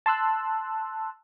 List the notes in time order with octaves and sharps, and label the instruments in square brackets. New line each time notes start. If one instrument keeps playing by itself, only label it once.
[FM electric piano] A5 C6 E6 F#6